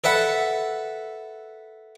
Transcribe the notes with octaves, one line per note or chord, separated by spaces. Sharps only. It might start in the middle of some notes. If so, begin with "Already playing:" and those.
A4 B4 E5 F#5